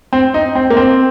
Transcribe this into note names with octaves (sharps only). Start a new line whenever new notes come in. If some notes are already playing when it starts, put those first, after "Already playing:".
C4
D#4
C4
A#3
C4